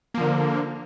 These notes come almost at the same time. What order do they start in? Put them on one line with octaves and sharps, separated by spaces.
A#3 F3 D3